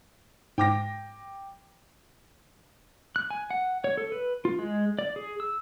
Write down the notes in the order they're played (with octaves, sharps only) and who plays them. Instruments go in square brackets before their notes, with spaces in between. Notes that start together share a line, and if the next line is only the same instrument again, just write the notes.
[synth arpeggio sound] G#2 [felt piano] G5 D6 A#6
[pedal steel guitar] F#6
G#5
F#5
C#5
A4
B4
F4
G#3
D5
G#4
E6